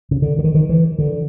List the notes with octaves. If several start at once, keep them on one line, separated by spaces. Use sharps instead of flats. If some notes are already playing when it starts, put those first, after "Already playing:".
C#3
D3
D3
D#3
D#3
E3
D3